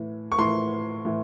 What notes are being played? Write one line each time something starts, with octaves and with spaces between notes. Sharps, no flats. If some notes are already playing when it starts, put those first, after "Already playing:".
Already playing: A2 E3
C#6
A2 E3 C6
A2 E3